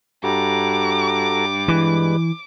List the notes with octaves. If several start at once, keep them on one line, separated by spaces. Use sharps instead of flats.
G2 F#4 A4 A#5 D6
E3 G3 G#3 B4